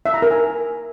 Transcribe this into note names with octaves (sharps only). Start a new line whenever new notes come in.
E5
A#5
A#4
G#5